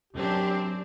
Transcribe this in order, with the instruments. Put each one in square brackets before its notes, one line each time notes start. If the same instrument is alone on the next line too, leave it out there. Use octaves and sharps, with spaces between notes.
[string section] F#2 C4 D4 [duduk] G4